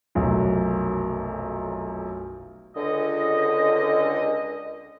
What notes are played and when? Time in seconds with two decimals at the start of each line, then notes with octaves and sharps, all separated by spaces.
0.15 F1 B1 F#2
2.77 C#2 D3 D#5